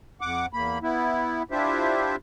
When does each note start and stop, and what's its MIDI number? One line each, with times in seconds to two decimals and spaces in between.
0.21 0.46 41
0.21 0.46 78
0.21 0.46 86
0.53 0.78 40
0.53 0.78 58
0.53 0.78 83
0.82 1.43 59
0.82 1.43 64
1.51 2.16 62
1.51 2.16 64
1.51 2.16 65
1.51 2.16 67
1.51 2.16 72
1.51 2.16 76